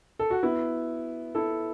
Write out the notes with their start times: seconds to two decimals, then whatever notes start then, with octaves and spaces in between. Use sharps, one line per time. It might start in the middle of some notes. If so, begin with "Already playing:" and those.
0.19 A4
0.30 F#4
0.43 B3 E4
1.35 E4 A4